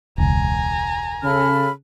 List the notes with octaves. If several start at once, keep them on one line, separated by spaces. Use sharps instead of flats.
E1 C#2 G#5 A#5
C#3 A4 B5 F6